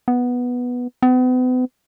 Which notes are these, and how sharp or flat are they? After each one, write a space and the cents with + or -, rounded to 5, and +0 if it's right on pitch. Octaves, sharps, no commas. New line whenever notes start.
B3 -5
B3 +40